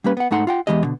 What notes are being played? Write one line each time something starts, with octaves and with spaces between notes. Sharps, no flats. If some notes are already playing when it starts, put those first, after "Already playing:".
G3 A#3 C#4 B4
B3 F#5
G#2 A3 D#4 F#5 A#5 C6
F4 F#5 G5
E2 A#2 E3 G#3 G4 D#5
B2 D3